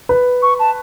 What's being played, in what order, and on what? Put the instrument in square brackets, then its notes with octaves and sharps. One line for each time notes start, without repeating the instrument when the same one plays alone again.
[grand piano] B4
[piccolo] C#6
A5